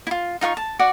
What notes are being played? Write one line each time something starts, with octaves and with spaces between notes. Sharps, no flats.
E4 F4
D#4 F4 F#5 C#6
A5
F#4 D5 F#5